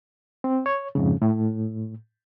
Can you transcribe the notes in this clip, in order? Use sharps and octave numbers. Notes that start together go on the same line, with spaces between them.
C4
C#5
F2 G#2 C#3
A2